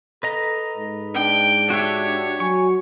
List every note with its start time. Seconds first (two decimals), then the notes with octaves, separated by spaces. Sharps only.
0.23 A4 B4 D#5 A#5
0.77 G#2
1.14 D4 G5
1.70 F#4 G4 C#5 E5
2.40 F#3 G#5 C#6